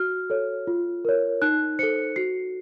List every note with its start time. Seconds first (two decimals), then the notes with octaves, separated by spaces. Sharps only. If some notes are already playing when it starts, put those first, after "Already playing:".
Already playing: F#4 F6
0.30 A4 C#5
0.67 F4
1.05 A#4 C#5
1.42 D#4 F#6
1.79 A4 C5 C#7
2.16 F#4 C7